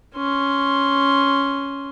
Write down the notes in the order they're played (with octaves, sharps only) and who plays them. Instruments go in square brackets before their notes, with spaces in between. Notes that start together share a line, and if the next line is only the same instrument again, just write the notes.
[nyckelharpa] C#4 C6